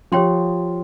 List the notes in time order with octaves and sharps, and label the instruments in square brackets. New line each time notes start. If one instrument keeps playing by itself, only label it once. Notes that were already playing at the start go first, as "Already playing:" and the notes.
[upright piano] F3 [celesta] G4 C#5 G5 C6